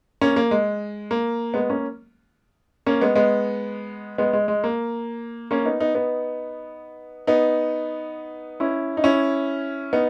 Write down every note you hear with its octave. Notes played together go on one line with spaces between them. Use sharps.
A#3 C#4
A#3
G#3
A#3
G#3 B3
A#3 C#4
A#3 C#4
G#3 B3
G#3 B3
G#3 B3
G#3
G#3
A#3
A#3 C#4
B3 D#4
B3 D#4
B3 D#4
B3 D#4
C#4 E4
D#4
C#4 E4
B3 D#4